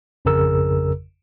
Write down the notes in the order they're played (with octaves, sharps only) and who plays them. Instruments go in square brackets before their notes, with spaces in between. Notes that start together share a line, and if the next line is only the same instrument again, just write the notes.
[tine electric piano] G#1 F2 C#3 G#4 A#4 E6